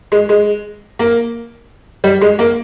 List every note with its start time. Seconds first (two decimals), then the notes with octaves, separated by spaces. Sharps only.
0.12 G#3
0.29 G#3
0.99 A#3
2.04 G3
2.21 G#3
2.39 A#3